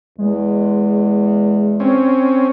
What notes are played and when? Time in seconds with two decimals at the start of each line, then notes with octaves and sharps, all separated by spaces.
0.18 E2 G#3
1.80 C4 C#4